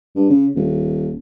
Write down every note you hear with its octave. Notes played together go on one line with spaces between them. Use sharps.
G2
C#3
D#1